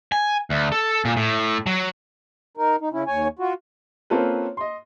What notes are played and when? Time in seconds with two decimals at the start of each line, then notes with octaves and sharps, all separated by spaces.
0.12 G#5
0.50 D2
0.72 A4
1.05 A#2
1.17 A2
1.66 F#3
2.57 D#4 A#4
2.81 D#4
2.92 C#3 C#4 E4
3.07 D#2 C#5 G#5
3.39 F4 F#4
4.10 A#3 C4 C#4 F4 A4 B4
4.57 D#5 C6